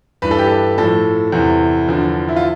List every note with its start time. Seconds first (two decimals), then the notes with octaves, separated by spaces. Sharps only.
0.22 G2 E3 B4
0.31 A4
0.38 G4
0.47 A4
0.78 A2 F3 A4
1.32 E2 C3 E3
1.89 E2 D3 F3
2.29 E4
2.36 F4